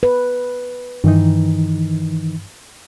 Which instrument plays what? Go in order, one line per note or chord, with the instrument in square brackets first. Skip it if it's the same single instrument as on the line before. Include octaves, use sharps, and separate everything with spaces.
[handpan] B4
[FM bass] G2 [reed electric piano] D#3 E3 D#4